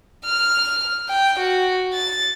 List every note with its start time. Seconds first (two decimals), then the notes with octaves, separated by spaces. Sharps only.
0.25 F6
1.09 G5
1.39 F#4
1.94 A6